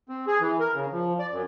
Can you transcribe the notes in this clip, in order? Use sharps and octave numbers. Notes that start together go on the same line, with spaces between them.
C4
G#4
E3
A#4
C#3
F3
D5
F#2